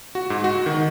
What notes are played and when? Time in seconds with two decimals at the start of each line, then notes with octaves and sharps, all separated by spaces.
0.15 F#4
0.30 G#2
0.44 F#4
0.66 D#3